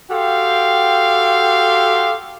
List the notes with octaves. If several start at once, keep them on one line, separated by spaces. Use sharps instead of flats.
F#4 G4 A4 F5 G5 C6